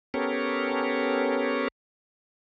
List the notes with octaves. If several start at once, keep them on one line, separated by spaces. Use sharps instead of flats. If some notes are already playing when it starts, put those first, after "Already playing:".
B3 C#4 G4 A4 A#4 C#5